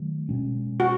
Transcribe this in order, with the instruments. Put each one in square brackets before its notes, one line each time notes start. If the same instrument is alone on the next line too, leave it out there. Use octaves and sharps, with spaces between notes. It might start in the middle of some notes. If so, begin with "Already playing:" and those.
Already playing: [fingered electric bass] D#3 F#3 A3
B2 G#3 C#4
[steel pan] F#4